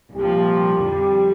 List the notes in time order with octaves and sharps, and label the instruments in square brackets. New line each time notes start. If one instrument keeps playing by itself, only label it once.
[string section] C2 A#2 F3 [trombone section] G4
[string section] F2 D3 G3